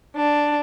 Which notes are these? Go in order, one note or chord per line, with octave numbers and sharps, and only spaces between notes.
D4